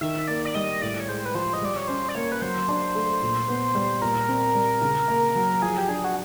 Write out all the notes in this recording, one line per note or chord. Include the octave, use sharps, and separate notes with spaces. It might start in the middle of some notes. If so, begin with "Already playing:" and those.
D#3 E5
A#3 D5
D5
G3 D#5
A2 D5
C#5
G#3 C5
B4
F3 C5
D#5
G3 D5
C#5
C#4 C5
D5
A#3 C#5
B4
F#3 C5
D4
A3
A#2
B3
G3
A#2 A#4
C4
G3
C#3
A#3
F#3
F3 G#4
G4
D4 G#4
F#4